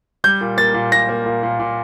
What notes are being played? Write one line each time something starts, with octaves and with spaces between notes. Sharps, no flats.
G3 G6
A#2
A#3 A6
A#2
A#2 A#6
A#3
A#2
A#2
A#2